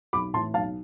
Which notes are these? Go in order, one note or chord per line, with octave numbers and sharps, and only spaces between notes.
B1 B5 D6
A2 E3 A5 C6
B1 F5 A5